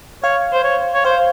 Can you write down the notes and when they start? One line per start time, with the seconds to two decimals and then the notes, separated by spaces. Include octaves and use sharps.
0.24 C#5 F5
0.53 C5
0.64 C#5
0.94 C#5
1.04 C5 F5